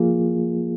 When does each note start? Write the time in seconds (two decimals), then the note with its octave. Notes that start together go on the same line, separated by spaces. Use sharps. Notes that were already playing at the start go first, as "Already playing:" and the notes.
Already playing: F3 A#3 F4 G#4